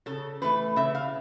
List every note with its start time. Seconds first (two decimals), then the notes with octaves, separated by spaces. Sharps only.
0.06 C#3 A4
0.42 E3 A3 B4
0.76 C#3 E5
0.95 F5